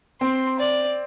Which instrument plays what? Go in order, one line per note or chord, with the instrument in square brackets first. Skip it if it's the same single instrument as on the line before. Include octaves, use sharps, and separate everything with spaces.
[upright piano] C4 [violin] C6
[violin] D5